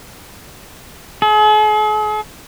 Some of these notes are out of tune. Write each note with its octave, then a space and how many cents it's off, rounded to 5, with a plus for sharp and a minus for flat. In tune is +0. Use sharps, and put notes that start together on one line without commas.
G#4 +45